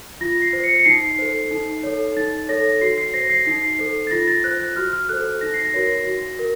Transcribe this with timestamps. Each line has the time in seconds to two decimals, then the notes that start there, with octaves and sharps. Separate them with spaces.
0.21 F4 A#6
0.42 C7
0.53 C5
0.64 C#7
0.79 C#7
0.85 D#4 C7
1.19 A4 C5
1.51 D#4
1.83 A4 C#5
2.17 D#4 A6
2.49 A4 C#5 A#6
2.81 F#4 C7
2.98 C7
3.14 C5 A#6
3.30 C7
3.46 D#4 C7
3.79 A4 C5
4.07 A6
4.11 F4 A#6
4.27 A6
4.44 C5 F#6
4.60 F#6
4.76 F#4 F6
4.93 F6
5.09 A4 C5 F#6
5.41 D#4 A#6
5.54 C7
5.65 A#6
5.74 F#4 A#4 C#5
6.07 F#4
6.39 A#4